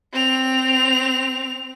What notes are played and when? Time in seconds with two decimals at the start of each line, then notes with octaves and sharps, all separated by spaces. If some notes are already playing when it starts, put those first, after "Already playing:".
0.13 C4 F7